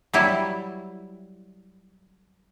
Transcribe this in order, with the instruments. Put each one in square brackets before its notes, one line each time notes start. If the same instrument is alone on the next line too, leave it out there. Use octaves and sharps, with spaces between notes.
[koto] F#3 G3 E4